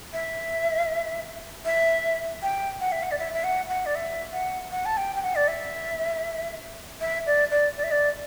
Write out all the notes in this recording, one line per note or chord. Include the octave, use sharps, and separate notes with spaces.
E5
E5
G5
F#5
E5
F#5
D5
E5
E5
F#5
F#5
D5
E5
F#5
F#5
A5
G5
G5
F#5
D5
E5
E5
D5
D5
D5
E5
D5